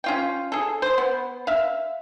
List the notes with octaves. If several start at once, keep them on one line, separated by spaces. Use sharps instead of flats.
C#4 F4 G5
G#4 A4
C5
B3
E5 F5